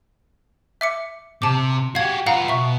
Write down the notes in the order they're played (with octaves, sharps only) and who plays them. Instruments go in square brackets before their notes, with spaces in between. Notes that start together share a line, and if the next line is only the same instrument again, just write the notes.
[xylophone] E5 D6 C#7
[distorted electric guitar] C3 [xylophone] A5 D6
[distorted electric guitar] F#4 G4 [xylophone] F5 G#6
[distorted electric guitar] F4 B4 [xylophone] F5 F#5 A#5
[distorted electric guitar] B2 [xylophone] E5 C#6